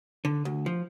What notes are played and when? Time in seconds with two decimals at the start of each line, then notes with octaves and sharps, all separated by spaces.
0.25 D3
0.45 D2
0.66 F3